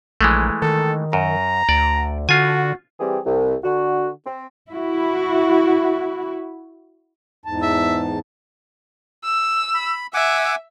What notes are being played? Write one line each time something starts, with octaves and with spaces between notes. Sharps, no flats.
A#1 E3 G#3 A3
D#3 A4
F#2 A#5
D2 D5
D3 F4 F#4 G#5
E3 G3 C4 G4 G#4
C2
D3 F#4
C4
E4 F#4
E2 G#2 A5
E5
E6
B5
E5 F#5 G#5 D6